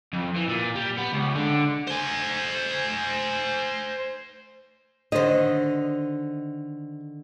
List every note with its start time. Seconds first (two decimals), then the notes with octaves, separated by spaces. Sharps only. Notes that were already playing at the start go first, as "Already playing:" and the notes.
0.13 F2
0.36 E3
0.49 A#2
0.76 G3
0.98 B3
1.13 C#2
1.35 D3
1.87 C5 G#5
5.12 D3 D#3 C5 D#5